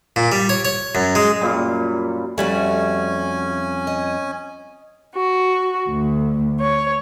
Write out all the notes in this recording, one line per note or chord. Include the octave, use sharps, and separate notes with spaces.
A#2
G3
C#5
C#5
F#2
G#3
F#2 A#2 G3
F2 G3 A3 C#4 F#4 G#5
D#5
F#4
D2
C#5